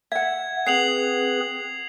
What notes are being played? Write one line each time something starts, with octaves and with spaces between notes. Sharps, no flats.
E5 F#5 G#6
C4 G#4 B4 F#5 C7 F7 F#7